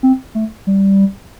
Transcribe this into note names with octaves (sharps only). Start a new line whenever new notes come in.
C4
A3
G3